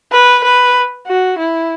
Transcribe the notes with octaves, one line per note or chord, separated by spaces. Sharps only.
B4
B4
F#4
E4